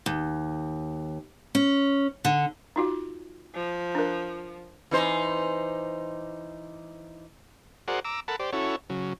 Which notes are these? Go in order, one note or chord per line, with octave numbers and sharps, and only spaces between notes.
D#2
C#4
D3
D#4 F4 F#4
F3
D4 A#4
E3 D#4 C5
F#4 G#4 A#4 C5 D5 F#5
A#5 D6 E6
A4 A#4 F#5 A5 B5
G4 C5 D5
C#4 E4 F#4 A4 C#5
C#3 F#3